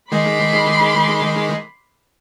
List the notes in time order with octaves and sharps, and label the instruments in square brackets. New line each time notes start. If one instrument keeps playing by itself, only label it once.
[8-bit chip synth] D#3 G#3 [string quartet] B5 C6 D6